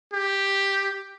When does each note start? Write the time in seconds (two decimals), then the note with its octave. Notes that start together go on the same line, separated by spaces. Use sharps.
0.13 G4